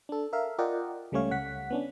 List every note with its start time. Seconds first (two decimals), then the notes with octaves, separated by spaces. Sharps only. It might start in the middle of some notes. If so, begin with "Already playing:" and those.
0.09 D4 A4
0.33 A#4 E5 F5
0.58 F4 A#4 D5 D#5 F#5 G5
1.12 C#2 G3 A3 C#4 C#5 F5
1.31 C#2 F#5 B6
1.70 B3 C#4 D4